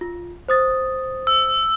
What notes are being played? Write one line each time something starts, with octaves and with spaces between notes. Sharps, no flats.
F4
C5 D#6 A6
E6